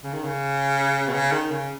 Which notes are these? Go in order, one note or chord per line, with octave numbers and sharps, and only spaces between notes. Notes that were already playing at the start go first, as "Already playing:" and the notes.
C#3
D#3
C#3
B2
C#3
D#3
C#3